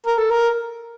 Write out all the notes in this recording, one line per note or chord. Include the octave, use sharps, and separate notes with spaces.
A#4
A4
A#4